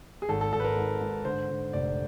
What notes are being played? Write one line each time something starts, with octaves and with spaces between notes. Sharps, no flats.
G#4
G#1 A4
A4
G#1 A4
B4
A#4
G#2
G#2
D3 C5
D3
F1 D5